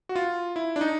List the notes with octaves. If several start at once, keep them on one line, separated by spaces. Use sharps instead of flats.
F#4
F4
E4
D4
D#4